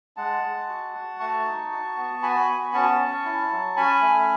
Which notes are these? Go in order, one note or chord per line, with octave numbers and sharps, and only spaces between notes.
G#3 F#5 A5
G#3
F#4
F#4
A3 A5 C#6
D#4
F#4
B3
F#4 G#5 B5
B3
C#4 A5 C#6
C#4
E4
F#3
C#4 G#5 B5
A3